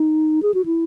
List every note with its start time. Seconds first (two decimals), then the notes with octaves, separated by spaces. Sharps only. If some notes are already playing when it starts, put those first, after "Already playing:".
Already playing: D#4
0.43 G#4
0.54 F#4
0.66 E4